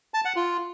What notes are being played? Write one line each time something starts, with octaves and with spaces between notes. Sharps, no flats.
A5
F#5
F4